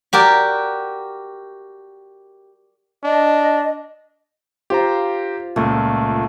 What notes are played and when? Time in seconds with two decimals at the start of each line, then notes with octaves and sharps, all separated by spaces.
0.13 F#4 G4 A#4 D5
3.04 D4 D#5
4.70 F4 G4 C5 A#5
5.56 C#2 A#2 A3